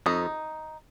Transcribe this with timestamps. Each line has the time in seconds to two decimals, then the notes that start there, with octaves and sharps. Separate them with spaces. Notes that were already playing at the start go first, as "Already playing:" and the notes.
0.06 F2 D#4